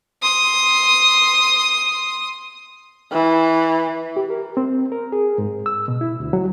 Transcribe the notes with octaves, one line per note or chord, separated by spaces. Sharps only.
C6 D#6
E3
G4
A#4
C4
A#4
G#4
G#2
E6
B2
E4
D2
F#3